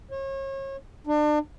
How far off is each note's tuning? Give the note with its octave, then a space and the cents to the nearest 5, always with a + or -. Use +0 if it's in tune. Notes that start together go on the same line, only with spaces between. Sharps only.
C#5 -35
D4 +35